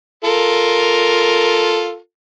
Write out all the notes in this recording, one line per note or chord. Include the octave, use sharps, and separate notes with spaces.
F4 A4 A#4